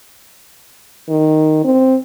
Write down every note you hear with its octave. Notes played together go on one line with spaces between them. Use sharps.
D#3
C4